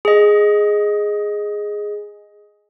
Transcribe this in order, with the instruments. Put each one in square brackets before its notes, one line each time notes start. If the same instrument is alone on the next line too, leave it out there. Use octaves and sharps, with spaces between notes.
[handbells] G#4 D#5